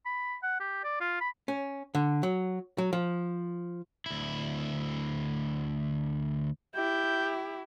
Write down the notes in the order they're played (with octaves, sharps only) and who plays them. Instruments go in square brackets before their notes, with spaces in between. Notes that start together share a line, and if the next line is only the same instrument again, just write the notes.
[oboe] B5
F#5
G4
D5
F4
B5
[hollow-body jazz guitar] C#4
D3
F#3
F#3
F3
[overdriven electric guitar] D2 E4
[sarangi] E4 [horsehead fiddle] G4 [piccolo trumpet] G6